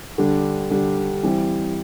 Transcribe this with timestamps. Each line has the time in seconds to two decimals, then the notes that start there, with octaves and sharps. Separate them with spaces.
0.18 D3 G3 D4
0.70 D3 G3 D4
1.23 E3 G3 C4 E4